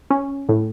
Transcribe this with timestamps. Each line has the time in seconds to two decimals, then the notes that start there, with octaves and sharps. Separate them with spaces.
0.10 C#4
0.49 A2